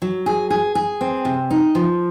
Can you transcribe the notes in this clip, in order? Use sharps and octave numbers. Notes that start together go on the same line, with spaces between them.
F#3
G#4
G#4
G#4
C4
C3
D#4
F3